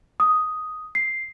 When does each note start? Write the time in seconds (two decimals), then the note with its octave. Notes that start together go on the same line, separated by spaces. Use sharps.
0.20 D#6
0.95 C7